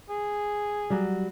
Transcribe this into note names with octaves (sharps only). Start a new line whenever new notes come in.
G#4
F#3 G3